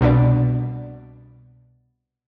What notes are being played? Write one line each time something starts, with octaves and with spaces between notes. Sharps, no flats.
C2 B2 B3 D4 D5